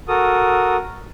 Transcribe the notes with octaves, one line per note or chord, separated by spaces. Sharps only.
F#4 A4 A#4 D#6